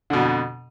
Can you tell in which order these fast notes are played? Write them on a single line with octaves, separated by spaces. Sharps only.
D3 B2 F2